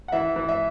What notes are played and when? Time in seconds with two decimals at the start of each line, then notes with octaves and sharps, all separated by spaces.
0.08 F#5
0.12 E3 E5
0.36 E3
0.49 E5